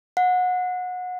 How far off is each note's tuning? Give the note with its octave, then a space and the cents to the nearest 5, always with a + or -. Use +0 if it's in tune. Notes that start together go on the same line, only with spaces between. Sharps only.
F#5 -25